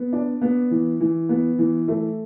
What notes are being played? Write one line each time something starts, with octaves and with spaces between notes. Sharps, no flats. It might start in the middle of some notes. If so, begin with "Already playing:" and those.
Already playing: B3
D4
B3
E3
E3
B3
E3
A3